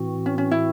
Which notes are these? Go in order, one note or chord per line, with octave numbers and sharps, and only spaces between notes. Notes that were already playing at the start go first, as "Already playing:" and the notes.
Already playing: A2 E3 C4 F#4
C#4
C#4
E4